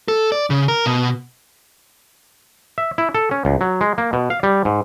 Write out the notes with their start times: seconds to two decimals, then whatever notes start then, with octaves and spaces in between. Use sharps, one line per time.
0.08 A4
0.32 D5
0.50 C#3
0.68 A#4
0.86 B2
2.78 E5
2.98 E4
3.15 A4
3.31 C#4
3.45 C#2
3.61 F#3
3.81 G#3
3.98 A#3
4.13 B2
4.30 F5
4.43 G3
4.65 G#2